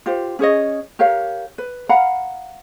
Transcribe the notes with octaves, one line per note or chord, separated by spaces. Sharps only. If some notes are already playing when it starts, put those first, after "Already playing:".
F4 G4 C5
C#4 G#4 C#5 D#5
G4 A#4 C#5 F5
B4
F5 F#5 A#5 B5